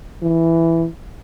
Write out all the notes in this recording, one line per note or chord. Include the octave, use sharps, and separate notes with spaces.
E3